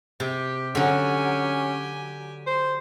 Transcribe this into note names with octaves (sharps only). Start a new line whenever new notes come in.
C3 G4
D3 F#3 C#4 G4 G#5
C5